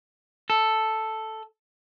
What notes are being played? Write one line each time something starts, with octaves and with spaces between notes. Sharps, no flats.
A4